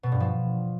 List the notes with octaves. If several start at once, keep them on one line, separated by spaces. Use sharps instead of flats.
B2
G2
F3